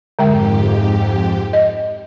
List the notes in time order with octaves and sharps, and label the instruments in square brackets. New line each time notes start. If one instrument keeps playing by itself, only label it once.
[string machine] F2 G#2 G4 [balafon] D3 G#3 G5
[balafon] D#5